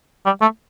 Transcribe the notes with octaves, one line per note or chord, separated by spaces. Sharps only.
G3
A3